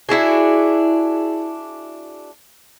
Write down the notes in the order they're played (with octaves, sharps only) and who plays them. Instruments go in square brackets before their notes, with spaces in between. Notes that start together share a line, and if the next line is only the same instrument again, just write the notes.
[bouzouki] D4 E4 F#4 G#4